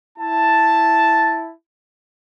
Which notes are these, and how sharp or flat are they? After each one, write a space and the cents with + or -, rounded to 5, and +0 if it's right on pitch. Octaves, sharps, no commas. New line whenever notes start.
E4 +0 A5 +0